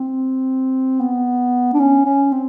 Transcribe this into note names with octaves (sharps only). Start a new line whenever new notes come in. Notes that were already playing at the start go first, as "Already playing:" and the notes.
Already playing: C4
B3
D4
C#4
C#4
C4